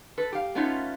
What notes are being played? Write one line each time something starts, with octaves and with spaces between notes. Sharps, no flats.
A4 B4
G4 F5
A3 B3 C#4 D#4 F4 F5